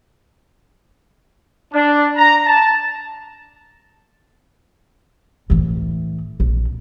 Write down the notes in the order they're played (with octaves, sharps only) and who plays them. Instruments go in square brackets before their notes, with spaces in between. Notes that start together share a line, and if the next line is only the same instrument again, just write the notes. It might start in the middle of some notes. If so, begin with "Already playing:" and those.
[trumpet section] D4
A#5
A5
[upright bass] A2 E3
A#1